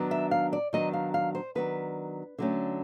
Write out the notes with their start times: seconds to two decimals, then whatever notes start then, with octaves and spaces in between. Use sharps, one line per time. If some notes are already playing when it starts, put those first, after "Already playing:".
Already playing: D#3 F#3 B3 D4
0.11 E5
0.31 F5
0.53 D5
0.73 D#3 F#3 B3 D4 D#5
0.93 F5
1.14 F5
1.35 C5
1.55 D#3 F#3 B3 D4 B4
2.39 D3 F#3 A3 C#4